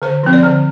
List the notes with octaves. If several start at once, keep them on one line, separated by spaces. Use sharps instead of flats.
D3 C5
F3 C4
D5
D3 C5